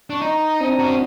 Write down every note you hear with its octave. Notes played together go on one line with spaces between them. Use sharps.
D4 C#6
D#4 A#5
A#5
C4 D4 D#6
C#4 F#4